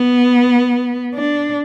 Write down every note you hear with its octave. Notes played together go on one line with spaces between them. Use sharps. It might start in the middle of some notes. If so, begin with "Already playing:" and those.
Already playing: B3
D4